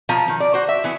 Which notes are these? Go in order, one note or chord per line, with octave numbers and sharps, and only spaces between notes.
B2 F3 A#5
D#3
D5
F#4 C5
E5
E3 B3